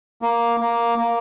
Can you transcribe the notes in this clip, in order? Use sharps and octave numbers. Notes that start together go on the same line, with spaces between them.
A#3
A#3
A#3